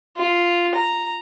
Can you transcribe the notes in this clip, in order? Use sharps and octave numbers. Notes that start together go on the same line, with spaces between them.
F4
A#5